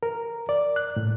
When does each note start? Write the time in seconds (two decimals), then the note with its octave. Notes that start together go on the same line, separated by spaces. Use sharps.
0.03 A#4
0.49 D5
0.76 F#6
0.96 A2